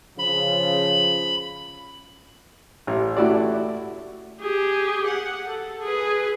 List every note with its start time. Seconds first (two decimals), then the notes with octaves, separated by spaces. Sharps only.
0.19 C#3 F3 B5
2.87 A1
3.17 A3 E4 F#4 G4 D5
4.41 G4 G#4
5.07 F#5
5.46 A4
5.83 G#4 B4